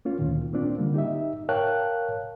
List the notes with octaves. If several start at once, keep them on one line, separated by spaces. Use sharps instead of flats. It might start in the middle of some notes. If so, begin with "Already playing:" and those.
A#3 C#4 F4
D2 A#2 D#3
A#3 C4 D4 F4
D3 G3 A#3
D#4 G4 D#5 E5
A#4 C#5 F5 G5 A5 F#6